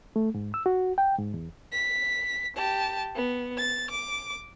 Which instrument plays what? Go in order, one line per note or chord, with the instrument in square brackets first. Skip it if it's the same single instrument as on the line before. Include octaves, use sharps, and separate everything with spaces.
[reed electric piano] A3
G#2
E6
F#4
G5
G#2
E2
[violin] B6
G4 A5
B3
A6
D6